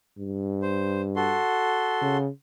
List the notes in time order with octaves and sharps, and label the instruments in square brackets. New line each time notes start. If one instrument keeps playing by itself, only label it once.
[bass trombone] G2
[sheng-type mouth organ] C5
F#4 A4 C6
[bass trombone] C#3